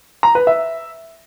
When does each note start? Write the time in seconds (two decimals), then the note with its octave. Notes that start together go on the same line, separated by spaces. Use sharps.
0.23 A#5
0.35 B4
0.47 E5